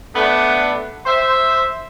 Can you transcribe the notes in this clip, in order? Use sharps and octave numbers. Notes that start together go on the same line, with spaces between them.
A3 B3 D4
C5 E5